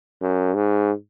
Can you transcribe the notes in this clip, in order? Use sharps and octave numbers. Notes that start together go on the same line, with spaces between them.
F#2
G#2